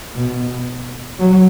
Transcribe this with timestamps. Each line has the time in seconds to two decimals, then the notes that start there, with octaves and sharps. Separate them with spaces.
0.15 B2
1.19 F#3